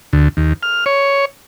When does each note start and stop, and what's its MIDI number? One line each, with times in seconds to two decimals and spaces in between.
0.13 0.28 38
0.37 0.53 39
0.63 0.84 89
0.86 1.25 73